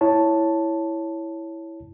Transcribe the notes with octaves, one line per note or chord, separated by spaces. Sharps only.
E4 C#5 A5